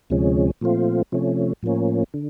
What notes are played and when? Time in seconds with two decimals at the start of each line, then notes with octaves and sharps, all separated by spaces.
0.10 D2 C3 F3 G#3 C#4
0.61 A#2 F3 A3 C4 F4
1.12 C3 F3 A3 C#4
1.63 A2 F3 A#3 C#4
2.14 D3